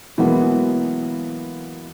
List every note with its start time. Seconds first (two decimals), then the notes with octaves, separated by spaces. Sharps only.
0.17 B2 E3 F#3 G#3 A#3 B3